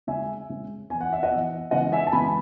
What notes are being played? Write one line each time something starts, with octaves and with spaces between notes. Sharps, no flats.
C#3 G#3 C#4 E5 G#5
C#3 G#3 C#4
E3 B3 G#5
F#5
E5
D#5 F#5
E3 B3
C#3 E3 G#3 B3 D#5 F#5
E5 G#5
A5
C#3 E3 G#3 B3 G#5 B5